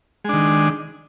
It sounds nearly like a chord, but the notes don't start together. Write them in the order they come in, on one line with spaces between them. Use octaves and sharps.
G#3 D4 D#3